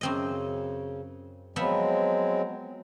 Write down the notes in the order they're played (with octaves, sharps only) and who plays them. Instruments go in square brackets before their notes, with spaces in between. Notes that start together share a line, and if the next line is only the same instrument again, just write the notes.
[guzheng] F#2 C4 D#5 [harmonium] C#3
[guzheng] F3 B3 E5 [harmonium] F#3 G#3 C4